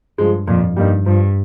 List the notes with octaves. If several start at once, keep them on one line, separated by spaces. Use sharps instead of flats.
G2 F3 G#3
F2 A#2
G2 G3 A#3 D#4
G2 F3